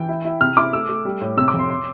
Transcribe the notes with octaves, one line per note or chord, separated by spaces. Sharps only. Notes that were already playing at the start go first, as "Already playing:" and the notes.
Already playing: E3 G5
E4
E4
C3 F6
E4 D6
A3 E6
A3
G3
A2
C3 E6
D6
F2
C6
C6